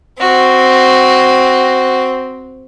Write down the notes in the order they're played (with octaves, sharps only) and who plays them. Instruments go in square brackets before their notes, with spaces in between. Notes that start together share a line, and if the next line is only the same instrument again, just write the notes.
[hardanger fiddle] C4 [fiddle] F#4